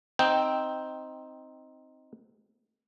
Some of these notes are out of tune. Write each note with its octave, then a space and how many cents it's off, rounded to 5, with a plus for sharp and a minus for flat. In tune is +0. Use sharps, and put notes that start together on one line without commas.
C4 +0 D#4 +5 G5 -5